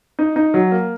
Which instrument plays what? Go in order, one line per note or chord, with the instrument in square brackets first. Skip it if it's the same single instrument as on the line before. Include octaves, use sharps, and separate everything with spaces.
[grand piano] D#4
D#4
F#3
A#3